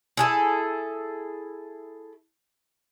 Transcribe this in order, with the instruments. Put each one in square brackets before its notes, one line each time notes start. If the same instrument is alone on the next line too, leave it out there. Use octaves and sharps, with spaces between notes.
[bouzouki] E4 G#4 A4